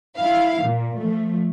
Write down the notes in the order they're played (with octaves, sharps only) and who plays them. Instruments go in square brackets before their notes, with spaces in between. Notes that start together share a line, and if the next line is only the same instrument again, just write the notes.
[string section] E4 F5
A#2
F3 A3